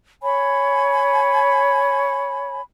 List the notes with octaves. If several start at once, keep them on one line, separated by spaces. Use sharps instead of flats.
C#5 G#5 B5